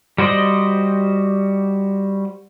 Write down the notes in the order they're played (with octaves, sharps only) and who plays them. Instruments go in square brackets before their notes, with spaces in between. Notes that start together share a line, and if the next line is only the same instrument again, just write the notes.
[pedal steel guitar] G3 F#4 C5 D5 D#5